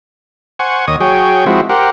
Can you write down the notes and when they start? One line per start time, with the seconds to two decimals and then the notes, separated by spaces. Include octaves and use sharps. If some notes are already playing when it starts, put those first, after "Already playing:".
0.59 C5 F#5 G#5 C#6
0.88 D#2 C#5 D#5 D#6
1.00 F#3 G#4 C#5 G5
1.46 F3 G#3 C4 E4 F#4
1.69 G4 A#4 C5 F#5